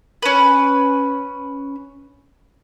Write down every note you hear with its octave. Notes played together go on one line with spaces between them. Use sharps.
C#4 B4